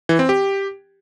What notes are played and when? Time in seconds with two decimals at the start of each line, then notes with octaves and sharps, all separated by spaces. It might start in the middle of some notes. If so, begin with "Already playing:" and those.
0.09 E3
0.19 C4
0.29 G4